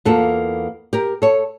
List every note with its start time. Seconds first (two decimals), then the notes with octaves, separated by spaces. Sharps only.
0.05 E2 E3 A#3 F4 A4
0.93 G4 A#4
1.22 A4 C#5